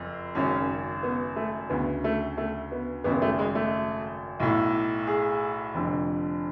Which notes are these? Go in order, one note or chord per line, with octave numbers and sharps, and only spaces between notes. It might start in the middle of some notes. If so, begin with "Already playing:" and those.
Already playing: F#1 F2
G#1 F#2 C#3 C#4
B3
A3
D2 C#3 B3
A3
A3
B3
G#1 F#2 C#3 B3
A3
G#3
A3
B1 A2
G#4
F1 F2 D3